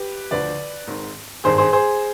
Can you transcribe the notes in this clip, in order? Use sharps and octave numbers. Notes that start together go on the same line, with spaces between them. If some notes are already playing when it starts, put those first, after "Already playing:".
Already playing: G4 B4
D2 D3 F3 B4 D5
G#1 G#2 D#3
G#1 G2 D#3 G#4 C5
G#4 C5
G#4 C5